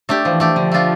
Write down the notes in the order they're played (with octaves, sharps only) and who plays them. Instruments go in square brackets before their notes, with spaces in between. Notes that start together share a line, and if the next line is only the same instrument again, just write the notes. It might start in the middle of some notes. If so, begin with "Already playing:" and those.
[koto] A3 D4 G4
[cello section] E3 [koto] F3
[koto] A3 D4 G4
[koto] D3 [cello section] F3
[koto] A3 D4 F4